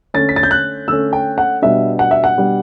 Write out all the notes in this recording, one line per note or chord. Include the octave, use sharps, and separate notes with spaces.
D3 A3 C#4 A6
B6
A6
G6
F#6
D3 A3 C#4 E6
G5
F#5
B2 G3 D4 E5
F#5
E5
F#5
B2 G3 D4